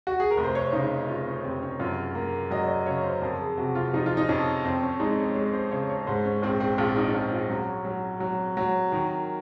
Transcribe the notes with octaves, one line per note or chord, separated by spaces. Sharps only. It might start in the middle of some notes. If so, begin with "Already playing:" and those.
F#4
G#4
A#4
F1
C5
C#5
C#3 D#4
C#3 F4
C#4
F1 C4
C#4
F#2 F4
A#3
F#3 D#5
D#5
C#3 C#5
C5
F2 A#4
G#4
C3 F#4
F4
F3 D#4
F4
D#4
F2 C#4
F2 C4
C#4
G#3 D#4
C#5
G#3 C#5
C5
C#3 C#5
C#5
G#2 C5
C#4
A#1 C4
C4
A#1 F4
D#4
A#1 C#4
F4
F#3 C#4
F#3
F#3
F#3
D#3 A#4